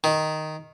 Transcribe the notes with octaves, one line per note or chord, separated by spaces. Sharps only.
D#3